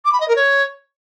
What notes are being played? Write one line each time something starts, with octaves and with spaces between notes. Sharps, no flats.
D6
B5
D#5
A#4
C#5